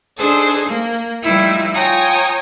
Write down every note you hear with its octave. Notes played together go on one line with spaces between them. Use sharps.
D4 D#4 G#4 A4 C5
A#3
F3 G3 A3 D#4 E4
F4 C#5 G5 G#5 A#5 D#6